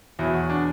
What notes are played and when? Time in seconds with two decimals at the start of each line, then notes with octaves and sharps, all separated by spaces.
0.19 E2 B2 F#3 E4
0.34 F#4
0.50 D4